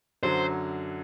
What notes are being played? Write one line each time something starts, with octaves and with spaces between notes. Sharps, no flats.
F#2 D3 F#3 C5